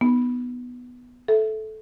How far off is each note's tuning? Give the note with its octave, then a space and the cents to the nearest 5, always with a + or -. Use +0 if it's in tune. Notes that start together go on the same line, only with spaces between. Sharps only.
B3 +0 D#4 +0
A4 -15 E5 +0